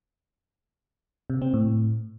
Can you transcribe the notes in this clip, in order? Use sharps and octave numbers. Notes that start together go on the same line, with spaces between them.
C3
C4
A2